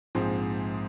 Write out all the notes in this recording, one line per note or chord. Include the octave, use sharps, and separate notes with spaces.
A#1 G#2 F3 G#3 C4